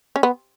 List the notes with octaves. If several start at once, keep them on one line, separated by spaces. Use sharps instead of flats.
C#4
B3